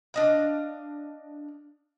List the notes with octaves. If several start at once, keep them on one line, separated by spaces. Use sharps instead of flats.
D4 D#5 F5